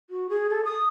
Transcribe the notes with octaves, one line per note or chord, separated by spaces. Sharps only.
F#4
G#4
A4
D#6